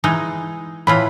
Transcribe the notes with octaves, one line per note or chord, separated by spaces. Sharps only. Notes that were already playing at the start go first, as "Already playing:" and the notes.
E3 G#3 D#4
A2 E3 F4 B5